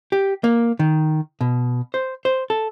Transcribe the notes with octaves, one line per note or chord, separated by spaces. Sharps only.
G4
A#3
D#3
B2
C5
C5
A4